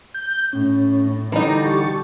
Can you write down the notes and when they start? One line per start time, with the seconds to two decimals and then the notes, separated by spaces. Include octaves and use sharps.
0.14 G6
0.53 A2 C#4
1.32 D3 E3 G3 D#4 A#5
1.65 G4 A5 C#6